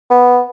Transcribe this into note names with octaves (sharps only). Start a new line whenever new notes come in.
B3